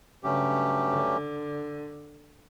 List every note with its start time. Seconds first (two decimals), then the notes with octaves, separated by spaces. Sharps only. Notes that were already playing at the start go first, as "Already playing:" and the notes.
0.23 G2 C#3 F#3 A3 C#4 G4
0.90 D3